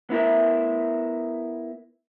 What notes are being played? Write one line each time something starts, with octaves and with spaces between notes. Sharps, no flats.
B3 E4 A#4 E5